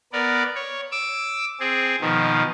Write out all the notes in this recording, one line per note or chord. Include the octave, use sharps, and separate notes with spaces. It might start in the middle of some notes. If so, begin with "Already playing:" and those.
B3 A#4 D5
C#5
D6 E6
C4 G#4
B2 D#3 F3